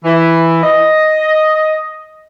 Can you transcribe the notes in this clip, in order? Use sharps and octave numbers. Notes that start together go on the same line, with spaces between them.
E3
D#5